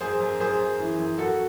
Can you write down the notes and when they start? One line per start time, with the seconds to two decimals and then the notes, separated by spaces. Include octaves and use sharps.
0.01 F#2 G#4 C5
0.20 F#2
0.40 F#2 G#4 C5
0.59 F#2
0.80 E3
0.99 F#2
1.18 F#2 F#4 A4